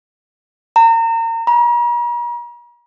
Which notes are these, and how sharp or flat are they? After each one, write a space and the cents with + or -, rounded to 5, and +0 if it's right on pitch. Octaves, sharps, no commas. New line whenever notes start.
A#5 -35
A#5 +45